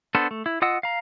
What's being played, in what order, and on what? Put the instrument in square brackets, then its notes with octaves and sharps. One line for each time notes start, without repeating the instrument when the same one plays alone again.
[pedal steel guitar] B3 D4 A4 C5
A3
E4
F4 D#5 F#5 E6
F5 A#5